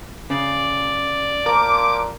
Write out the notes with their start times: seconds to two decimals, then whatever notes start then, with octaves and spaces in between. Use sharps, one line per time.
0.30 C#3 D5
1.46 A#2 F3 A#4 D6